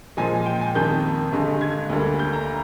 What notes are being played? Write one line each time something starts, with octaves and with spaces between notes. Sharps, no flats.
A#2 F3 G#3 G#5
G5
G#5
F2 D#3 A#3 G6
G2 D3 G#3
G#6
D2 D3 G3 A#3
G6
A#5